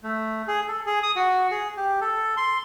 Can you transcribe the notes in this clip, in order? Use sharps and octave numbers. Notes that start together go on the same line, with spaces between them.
A3
G#4
A4
G#4
D#6
F#4
G#4
G4
A4
C6